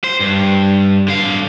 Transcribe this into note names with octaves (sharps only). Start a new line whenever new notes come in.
C5
G2
D3 F5